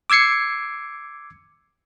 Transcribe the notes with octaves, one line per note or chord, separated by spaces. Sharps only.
D6 E6 G#6 C7 C#7